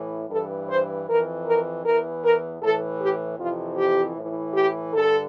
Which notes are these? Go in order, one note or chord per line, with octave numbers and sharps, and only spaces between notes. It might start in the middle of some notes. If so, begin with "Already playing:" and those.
Already playing: A2 E3
G2 E3 A4
C5
F2 E3 A#4
A#4
E2 E3 A#4
A#4
A2 E3 A4
G4
F2 C3 E3 F4
G4
A2 E3
G4
G2 D3 A4